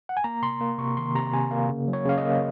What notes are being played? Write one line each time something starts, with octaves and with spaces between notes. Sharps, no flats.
F#5
G#5
A#3 A#5
C3 C6
A#3
C3 C#6
D#3 C6
C3 A#5
C3 G#5
A#3 F5
C#3
F#3
C#5
C#3 F5
D#5
A#3